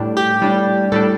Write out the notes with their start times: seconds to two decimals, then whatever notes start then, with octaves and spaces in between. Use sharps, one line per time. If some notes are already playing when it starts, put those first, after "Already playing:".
Already playing: A2 G3 D4
0.17 G4
0.41 A2 G3 D4
0.92 A2 G3 D4 A4